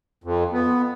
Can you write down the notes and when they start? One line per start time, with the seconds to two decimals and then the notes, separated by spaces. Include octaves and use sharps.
0.24 F2
0.53 B3